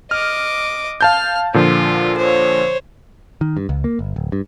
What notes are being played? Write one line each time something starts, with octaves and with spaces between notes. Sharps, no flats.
D#5 D6 F6
F5 A5 F6 G6
A#2 D3 F3 F4
C5 C#5
D#3
G2
C#2
A#3
G1
D1
G2